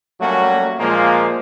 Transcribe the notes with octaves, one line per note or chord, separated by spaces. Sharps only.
F#3 G3 A3 A#3 C#4 F#4
A#2 F3 G#3 A#3